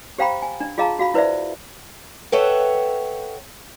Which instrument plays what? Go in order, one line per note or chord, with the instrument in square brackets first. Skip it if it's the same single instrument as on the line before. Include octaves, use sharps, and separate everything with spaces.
[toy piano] G4 C5 F5 G5 A#5 B5
G#5
D4
F4 G#4 D#5 F5 A5 A#5
F#4 F5 B5
E4 B4 C5 D5 E5
[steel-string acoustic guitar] A4 B4 C#5 E5 F#5 G5